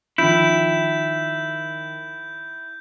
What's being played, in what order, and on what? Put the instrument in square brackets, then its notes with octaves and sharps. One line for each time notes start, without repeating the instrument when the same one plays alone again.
[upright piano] D#3 F3 [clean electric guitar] E4 [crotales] G6